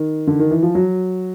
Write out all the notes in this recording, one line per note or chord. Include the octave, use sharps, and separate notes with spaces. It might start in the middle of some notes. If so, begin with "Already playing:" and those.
Already playing: D#3
D3
D#3
E3
F3
F#3